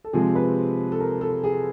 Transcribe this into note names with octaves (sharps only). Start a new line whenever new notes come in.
A4
C3 F3 G#3 C4 G#4
B4
A4
A#4
A4
G#4